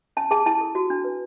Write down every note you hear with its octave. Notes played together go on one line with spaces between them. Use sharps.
C#4 A5
G#4 A5
E4 A5
A4
F#4
D4
B4